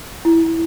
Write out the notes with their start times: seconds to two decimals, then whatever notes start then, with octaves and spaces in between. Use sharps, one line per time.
0.25 E4